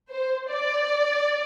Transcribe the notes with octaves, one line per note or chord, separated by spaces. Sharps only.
C5
D5